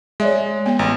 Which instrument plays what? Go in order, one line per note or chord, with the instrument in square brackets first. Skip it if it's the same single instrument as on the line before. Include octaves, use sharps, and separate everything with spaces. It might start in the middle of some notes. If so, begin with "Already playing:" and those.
[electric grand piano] G#3 [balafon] C#5 D5 E5
[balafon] B3 G#5
[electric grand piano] A1